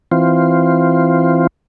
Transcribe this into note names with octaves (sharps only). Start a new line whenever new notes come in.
E3 C4 F4